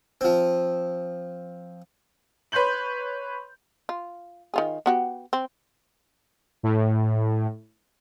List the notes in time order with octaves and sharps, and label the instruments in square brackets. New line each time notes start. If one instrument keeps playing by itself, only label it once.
[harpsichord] F3 C4
[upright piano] B4 C#5 C6 G6 F#7
[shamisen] F4
D#3 F4 G#4
B3 F#4 G4
C4
[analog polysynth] A2